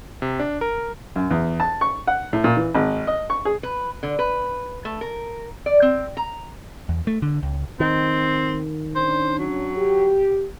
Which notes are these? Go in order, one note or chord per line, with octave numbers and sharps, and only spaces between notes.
C3
D4
A#4
F#2
E2
A5
C#6
F#5
A2
A#2
E3
G#1
D#5
C#6
G#4
B4
D3
B4
A3
A#4
D5
C4
A#5
E2
A3
D3
C#2
D#3 C4
C#4 D4 C5
F#3
G4